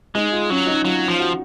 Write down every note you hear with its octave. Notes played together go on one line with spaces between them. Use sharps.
G#3 D#4
F4
F#3 C#4
D#4
F#3 F4
F3
F#4